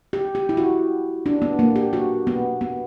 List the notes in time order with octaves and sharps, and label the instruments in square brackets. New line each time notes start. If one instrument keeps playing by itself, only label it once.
[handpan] G4
G4
E4
F#4
D4
B3
A#3
G4
F#4
B3
B3